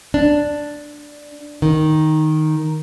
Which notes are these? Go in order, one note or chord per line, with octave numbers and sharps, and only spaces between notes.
D4
D#3